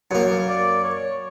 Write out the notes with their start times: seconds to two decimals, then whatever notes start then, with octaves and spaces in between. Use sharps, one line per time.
0.11 F#2 A#3
0.48 D5
0.84 C#5